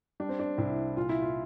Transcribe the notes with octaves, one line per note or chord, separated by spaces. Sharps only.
G3 D4
C4
D4
C2 E4
A#2 F4
E4
F4